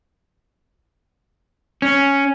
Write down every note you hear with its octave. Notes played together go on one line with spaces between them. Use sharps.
C#4